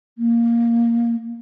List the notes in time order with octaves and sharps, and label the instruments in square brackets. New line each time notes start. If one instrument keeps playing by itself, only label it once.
[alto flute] A#3